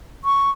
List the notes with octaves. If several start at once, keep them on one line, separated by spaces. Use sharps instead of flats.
C#6